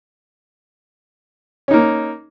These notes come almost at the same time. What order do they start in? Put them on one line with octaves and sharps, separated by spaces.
C#4 D#4 A#3